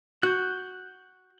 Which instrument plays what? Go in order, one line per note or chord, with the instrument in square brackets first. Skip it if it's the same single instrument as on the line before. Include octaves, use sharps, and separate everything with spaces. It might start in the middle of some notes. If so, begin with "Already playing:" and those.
[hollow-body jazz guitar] F#4 [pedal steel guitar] F#6 G6